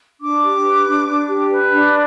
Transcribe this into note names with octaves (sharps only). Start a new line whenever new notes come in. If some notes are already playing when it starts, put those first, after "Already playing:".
D4 D6
G4
B4
D4
D4
G4
B4
D4